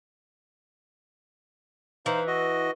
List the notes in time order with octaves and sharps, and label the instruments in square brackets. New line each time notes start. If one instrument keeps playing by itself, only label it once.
[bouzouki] E3 [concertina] D#4 C5 F5
[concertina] F#4 D#5